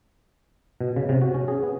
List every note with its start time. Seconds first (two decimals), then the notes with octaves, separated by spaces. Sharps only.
0.81 B2
0.96 C#3
1.09 C3
1.22 F#4
1.34 C#4
1.48 G#4
1.63 B3